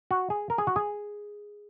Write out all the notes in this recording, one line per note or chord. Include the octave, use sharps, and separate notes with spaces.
F#4
G#4
A#4
G#4
F#4
G#4